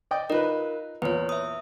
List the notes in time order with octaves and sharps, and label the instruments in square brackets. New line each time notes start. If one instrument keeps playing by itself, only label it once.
[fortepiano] D5 D#5 G5
[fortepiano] D#4 B4 [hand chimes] F4 A#4
[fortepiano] E2 A#2 [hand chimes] B4 C#5
[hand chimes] E5 D#6